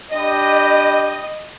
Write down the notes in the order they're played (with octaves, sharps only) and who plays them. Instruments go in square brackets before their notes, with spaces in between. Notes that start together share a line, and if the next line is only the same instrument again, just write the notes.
[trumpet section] D4 G4 B5 [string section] D#5